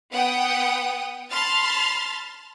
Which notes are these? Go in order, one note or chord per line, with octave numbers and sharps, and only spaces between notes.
B3 F#5 G5 D#6
A5 B5 C6 F6 A6